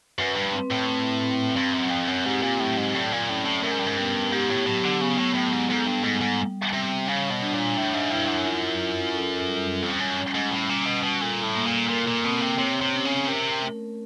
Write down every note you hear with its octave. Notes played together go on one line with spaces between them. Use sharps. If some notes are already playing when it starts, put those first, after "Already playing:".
F#2 B4
G2
C4
A2
C4
C4
G2 C4
F#2
F2 C4
F#2
G#2 G4
A#2
A2 F#3
G#2
A2 D5
A#2
A2 C#4
A2
A2 A#4
G#2
G2
G#2
G2 B3
G#2 G4
A2
A2 F#3
D3
C#3 B3
A2
A2 B3
G#2
G#2 A4
G2
G#2 G3
G#2
G3
C3 G3
C#3 C#5
B2
D4
A#2
A2 E5
G#2
G2 E4
F#2
F4
F4
A4
G3
F2 C#4
F#2
C#4
G#2
A2 G3
A#2
B2 G3
B2
A#2 A4
A2
A#3
A#2
A#2 A#4
A#2
B2 C4
C3
C3 C#5
C3
C#4
C#3
C3 A#4
A3